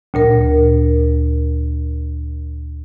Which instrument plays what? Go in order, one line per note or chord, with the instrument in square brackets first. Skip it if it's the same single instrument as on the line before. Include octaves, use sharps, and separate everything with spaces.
[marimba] D2 A#2 A#4